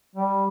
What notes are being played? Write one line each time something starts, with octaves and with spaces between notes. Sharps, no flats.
G3